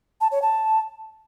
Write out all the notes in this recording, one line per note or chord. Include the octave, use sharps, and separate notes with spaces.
A5
C#5
A5